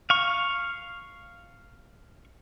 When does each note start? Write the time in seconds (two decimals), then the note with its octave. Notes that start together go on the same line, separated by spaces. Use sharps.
0.10 F5 C#6